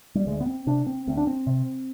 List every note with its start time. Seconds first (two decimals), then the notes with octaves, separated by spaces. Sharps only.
0.15 G3
0.27 D2 G#3
0.41 B3
0.46 C4
0.67 C3 D4
0.87 C4
1.07 D2 C4
1.17 D4
1.27 C4
1.47 C3